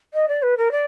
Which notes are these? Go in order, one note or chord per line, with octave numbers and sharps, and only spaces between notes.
D#5
D5
B4
A#4
D5